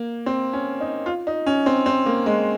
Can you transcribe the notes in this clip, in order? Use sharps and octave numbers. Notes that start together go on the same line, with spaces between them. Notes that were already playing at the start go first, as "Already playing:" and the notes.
Already playing: A#3
C4
C#4
D#4
F4
D#4
C#4
C4
C4
A#3
G#3